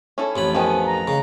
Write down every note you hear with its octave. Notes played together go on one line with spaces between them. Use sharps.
C#4 E4 A4
A1 F2 C#5 B5
D#3 F3 B3 G#5
A#5
C#3